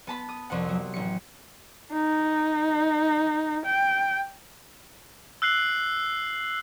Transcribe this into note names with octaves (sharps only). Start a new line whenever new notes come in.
B3 A5 B5
D#6
C2 F2 C3 F#5
F#3
A1 C#7
D#4
G5
E6 F#6 C7 F#7